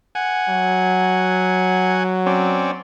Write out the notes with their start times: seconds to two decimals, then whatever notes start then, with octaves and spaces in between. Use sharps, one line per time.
0.15 F#5 G#5
0.50 F#3
2.26 C4 C#4 D5